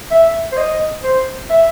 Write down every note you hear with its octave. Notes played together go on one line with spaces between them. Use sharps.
E5
C5
D#5
C5
E5